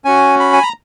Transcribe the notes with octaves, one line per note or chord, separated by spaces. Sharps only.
C#4 F#4 G#5
B5
G#5
A#5